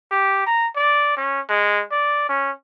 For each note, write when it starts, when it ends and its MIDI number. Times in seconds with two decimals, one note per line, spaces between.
0.11 0.45 67
0.47 0.67 82
0.76 1.13 74
1.17 1.40 61
1.50 1.82 56
1.91 2.25 74
2.29 2.51 61